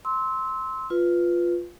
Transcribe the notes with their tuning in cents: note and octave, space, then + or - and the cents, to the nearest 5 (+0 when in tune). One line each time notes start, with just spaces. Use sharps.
C6 +0 E6 -25
F4 +0 B4 +0